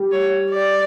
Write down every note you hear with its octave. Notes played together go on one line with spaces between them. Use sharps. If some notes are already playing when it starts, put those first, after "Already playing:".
Already playing: G3
C#5
D5